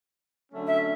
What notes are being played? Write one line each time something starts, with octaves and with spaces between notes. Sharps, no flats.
D3 F#3 A3 C#4
E5